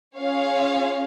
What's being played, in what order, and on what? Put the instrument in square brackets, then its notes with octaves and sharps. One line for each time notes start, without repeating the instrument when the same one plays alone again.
[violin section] C#4 F4 G#4 C#5 F5